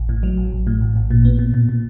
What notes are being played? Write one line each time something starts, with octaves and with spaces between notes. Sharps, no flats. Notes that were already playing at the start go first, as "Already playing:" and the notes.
Already playing: A1
A2
F#3
A1
A1
A2
A1
A1
A#2
B3
A#2
A#2
A#2